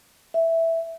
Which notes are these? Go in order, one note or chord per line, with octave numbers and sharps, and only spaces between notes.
E5